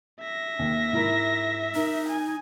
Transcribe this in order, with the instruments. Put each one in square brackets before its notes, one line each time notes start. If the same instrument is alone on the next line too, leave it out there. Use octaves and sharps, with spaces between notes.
[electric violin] E5 A#6
[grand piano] D#2
G#2 E4 A#4
[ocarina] D#4 [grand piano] A#4
[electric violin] G#5